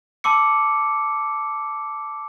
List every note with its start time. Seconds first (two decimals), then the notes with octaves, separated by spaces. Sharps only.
0.24 A5 C6 D6 E6 C#7